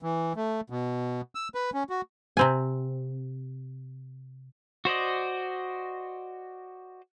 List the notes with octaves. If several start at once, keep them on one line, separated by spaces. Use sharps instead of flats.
E3
A3
B2
E6
B4
C#4
F#4
C3 C4 G#5
F#4 C5 D5 D#5